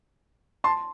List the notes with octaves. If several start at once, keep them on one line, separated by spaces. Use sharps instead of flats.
A5 C6